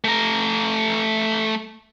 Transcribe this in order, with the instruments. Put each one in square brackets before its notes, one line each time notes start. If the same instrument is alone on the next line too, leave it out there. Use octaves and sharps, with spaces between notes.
[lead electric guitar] A3 A#5